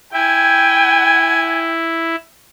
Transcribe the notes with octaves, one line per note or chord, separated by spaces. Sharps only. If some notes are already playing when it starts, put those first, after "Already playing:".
E4 G5 G#5